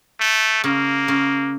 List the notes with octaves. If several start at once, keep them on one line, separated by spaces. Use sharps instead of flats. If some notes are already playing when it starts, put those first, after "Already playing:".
A3
C#3 A#3
C#3